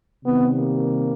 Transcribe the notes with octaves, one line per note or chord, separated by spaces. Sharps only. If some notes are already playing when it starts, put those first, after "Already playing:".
C3 D#3 G3 B3
A#3